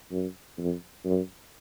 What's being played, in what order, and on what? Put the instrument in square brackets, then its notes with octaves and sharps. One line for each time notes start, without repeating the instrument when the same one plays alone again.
[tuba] F#2
F2
F#2